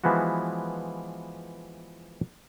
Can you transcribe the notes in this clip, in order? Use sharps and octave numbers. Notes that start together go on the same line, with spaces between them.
E3 F3 G#3 B3 F#4